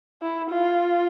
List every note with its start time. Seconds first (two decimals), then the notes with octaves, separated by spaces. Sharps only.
0.22 E4
0.50 F4